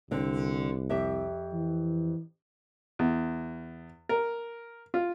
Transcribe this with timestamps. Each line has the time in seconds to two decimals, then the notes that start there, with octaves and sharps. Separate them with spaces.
0.11 C2 D3 C4
0.90 F2 G4 E5
1.54 E3
2.99 E2
4.09 A#4
4.94 F4